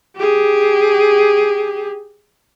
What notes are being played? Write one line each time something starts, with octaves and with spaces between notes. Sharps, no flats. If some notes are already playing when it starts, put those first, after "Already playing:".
G4 G#4